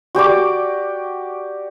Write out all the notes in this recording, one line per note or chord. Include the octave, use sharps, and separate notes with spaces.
F#4 G4 D5 D6